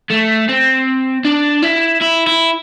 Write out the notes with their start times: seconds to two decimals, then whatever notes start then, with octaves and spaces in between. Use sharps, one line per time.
0.10 A3
0.49 C4
1.25 D4
1.63 E4
2.02 E4
2.27 E4